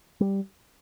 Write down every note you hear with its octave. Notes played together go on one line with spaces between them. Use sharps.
G3